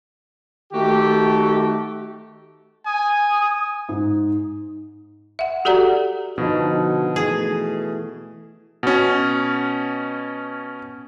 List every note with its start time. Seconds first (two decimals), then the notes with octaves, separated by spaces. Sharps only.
0.73 D#3 A3 F#4 G4
2.86 G#5 D#6
3.89 G#2
5.39 E5 F#5
5.65 F#4 G4 A4 D5 F#5 A#5
6.38 B2 D3 F3 D#4 F#4
7.16 E3 A3 G#4
8.83 B2 C#4